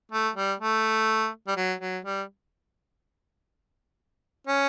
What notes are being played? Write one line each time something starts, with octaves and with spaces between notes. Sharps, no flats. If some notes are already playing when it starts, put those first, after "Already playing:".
A3
G3
A3
G3
F#3
F#3
G3
C#4